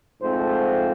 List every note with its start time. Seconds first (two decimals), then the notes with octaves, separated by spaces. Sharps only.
0.22 G#2 F3 A3 C4 C5